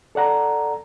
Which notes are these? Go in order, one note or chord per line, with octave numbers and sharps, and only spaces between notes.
A4 D5 F#5 A#5